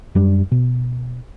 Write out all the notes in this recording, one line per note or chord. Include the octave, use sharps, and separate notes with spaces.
F#2 G3 D4
B2